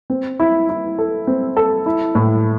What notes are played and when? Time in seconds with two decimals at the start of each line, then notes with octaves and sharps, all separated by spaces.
0.10 C4
0.40 E4
0.69 E4
0.99 A4
1.27 C4
1.57 A4
1.86 E4
2.15 A2